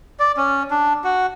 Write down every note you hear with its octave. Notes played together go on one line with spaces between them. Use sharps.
D5
C#4
D4
F#4